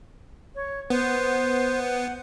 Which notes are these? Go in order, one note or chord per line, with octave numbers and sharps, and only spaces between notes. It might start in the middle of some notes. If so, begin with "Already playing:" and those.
C#5
B3 C5
F#5